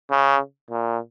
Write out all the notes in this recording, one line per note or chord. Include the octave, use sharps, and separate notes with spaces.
C#3
A#2